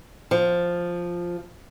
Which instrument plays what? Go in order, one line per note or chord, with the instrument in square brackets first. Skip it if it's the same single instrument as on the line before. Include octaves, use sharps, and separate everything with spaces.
[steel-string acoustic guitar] F3